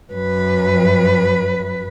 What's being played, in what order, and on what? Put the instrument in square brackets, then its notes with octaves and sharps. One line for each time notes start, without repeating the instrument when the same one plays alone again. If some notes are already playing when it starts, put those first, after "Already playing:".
[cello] F#2 B4